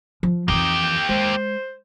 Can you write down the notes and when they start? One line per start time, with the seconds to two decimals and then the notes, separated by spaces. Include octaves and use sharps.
0.23 F3
0.48 F2 E3 A#3 D#4 G4
0.82 G5
1.09 G#3 C5